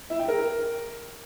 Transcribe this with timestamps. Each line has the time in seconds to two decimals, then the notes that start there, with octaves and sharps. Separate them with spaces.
0.10 E4
0.19 G5
0.28 A#4